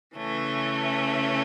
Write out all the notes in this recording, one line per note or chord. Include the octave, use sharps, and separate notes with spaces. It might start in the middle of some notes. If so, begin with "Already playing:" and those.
C#3 E3 A3 C#4